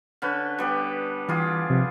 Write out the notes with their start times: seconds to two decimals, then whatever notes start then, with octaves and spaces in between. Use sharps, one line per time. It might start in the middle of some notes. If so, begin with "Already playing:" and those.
0.22 D3 C#4 B4
0.58 G3 B3 G4
1.29 E3 G3 F4 G#4
1.70 C3 F3